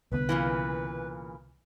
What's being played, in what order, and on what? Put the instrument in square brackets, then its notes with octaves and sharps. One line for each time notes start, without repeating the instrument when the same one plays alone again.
[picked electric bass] C2 D3 B3 [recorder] B4
[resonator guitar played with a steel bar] A#2 C#3 E3